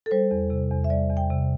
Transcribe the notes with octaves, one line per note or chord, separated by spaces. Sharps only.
A4
G3 C5
E2
C3
E2
E5
G3 D5
E2
G5
C3